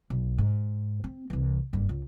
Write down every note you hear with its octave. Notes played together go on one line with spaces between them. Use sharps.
B1
G#2
C4
C2 E3
F#1 G2
C#2